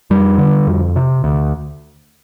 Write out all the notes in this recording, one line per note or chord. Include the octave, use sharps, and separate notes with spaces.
F2 G3
D3
F2
C3
D2